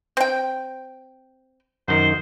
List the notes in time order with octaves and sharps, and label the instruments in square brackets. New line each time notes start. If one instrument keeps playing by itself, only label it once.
[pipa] C4 G5
[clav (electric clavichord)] F#2 D#3 [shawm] C5